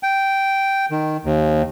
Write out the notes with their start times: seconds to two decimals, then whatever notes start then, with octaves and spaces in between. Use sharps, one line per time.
0.03 G5
0.91 D#3
1.25 D#2